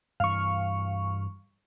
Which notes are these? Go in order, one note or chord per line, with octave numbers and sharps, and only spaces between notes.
G2 E3 F5 C#6